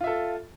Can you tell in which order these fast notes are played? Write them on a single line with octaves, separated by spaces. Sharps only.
F4 E5 A4